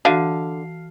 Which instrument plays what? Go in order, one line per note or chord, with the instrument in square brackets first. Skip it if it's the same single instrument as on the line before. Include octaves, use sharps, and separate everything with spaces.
[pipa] D3 [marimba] E3 F#4 [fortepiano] F5